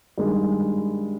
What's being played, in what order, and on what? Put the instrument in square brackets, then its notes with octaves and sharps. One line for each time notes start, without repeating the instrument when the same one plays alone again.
[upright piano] G2 D#3 G#3